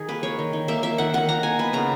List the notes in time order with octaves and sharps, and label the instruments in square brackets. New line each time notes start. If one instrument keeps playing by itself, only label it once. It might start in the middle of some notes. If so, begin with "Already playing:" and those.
Already playing: [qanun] D#3 G#4
A#3 B4
A#3 C#5
D#3
D#3
A#3 E5
A#3 E5
D#3 F#5
D#3 F#5
A#3 A#5
A#3 G#5
B3 B4
C#3 A#5